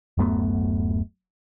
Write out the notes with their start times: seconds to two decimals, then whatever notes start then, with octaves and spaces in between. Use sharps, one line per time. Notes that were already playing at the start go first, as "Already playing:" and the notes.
0.17 D1 F#2 A3 B3